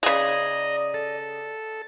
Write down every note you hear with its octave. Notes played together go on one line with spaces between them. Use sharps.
C#3 G#4 D5 D#5 A#5
A4